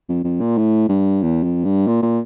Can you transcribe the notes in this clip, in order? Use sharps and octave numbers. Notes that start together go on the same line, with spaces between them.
F2
F2
A#2
A2
G2
E2
F2
G2
A#2
A#2